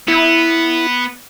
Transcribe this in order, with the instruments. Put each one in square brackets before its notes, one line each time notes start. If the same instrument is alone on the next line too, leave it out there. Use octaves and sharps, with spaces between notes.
[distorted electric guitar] B3 [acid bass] E4